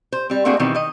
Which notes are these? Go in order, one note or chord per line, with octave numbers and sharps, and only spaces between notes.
C5
G3 C4
A3 A#3 C4 D4 F#4 G#4
B2 D#3 E3 G3 C4
D#3 D#5